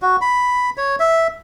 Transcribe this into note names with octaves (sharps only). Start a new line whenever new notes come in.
F#4
B5
C#5
E5